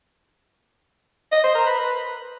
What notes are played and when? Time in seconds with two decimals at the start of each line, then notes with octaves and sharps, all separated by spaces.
1.32 D#5
1.44 C5
1.55 A#4
1.66 B4
1.78 B4